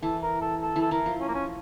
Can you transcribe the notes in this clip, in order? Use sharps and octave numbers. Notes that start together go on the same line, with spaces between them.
E3 A4
A#4
A4
A4
E3
A4
E3 A#4
F3
C#4
A#3
C#4